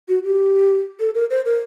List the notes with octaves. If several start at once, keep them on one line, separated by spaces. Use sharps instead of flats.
F#4
G4
A4
A#4
C5
A#4